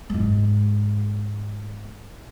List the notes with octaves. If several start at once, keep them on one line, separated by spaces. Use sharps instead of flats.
G#2 G#3